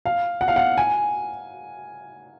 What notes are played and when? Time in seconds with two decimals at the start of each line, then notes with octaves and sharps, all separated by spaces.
0.05 F5
0.41 F#5
0.48 F5
0.56 F#5
0.78 G#5